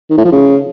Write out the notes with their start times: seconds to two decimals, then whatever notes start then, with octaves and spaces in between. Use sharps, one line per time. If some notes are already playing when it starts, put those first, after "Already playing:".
0.10 D#3
0.17 A2
0.25 F3
0.32 C#3